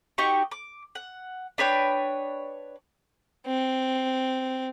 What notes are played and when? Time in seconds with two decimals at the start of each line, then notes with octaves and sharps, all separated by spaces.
0.18 D#4 F#4 G4 C#6
0.52 D6
0.95 F#5
1.58 D4 B4 C#5 G5
3.46 C4